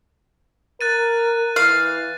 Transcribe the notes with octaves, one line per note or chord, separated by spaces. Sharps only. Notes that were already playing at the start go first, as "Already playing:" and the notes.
A#4 F#6 A6 D#7
E3 F5